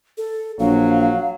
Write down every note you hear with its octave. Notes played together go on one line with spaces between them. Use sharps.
A4
A#1 F#3 F5